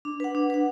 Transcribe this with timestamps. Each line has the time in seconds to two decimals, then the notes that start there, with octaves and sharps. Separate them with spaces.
0.05 D4
0.20 B4 F#5
0.35 D4
0.50 B4 F#5